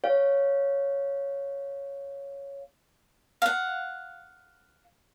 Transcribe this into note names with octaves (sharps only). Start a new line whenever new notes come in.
C#5 F5
F5 F#5